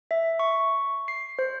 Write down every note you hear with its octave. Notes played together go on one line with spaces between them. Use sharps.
E5
C#6
C7
C5